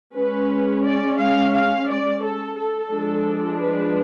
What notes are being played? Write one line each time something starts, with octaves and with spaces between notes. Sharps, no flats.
G#3 C#4 B4
D5
F5
F5
D5
A4
A4
F3 G#3 D4
B4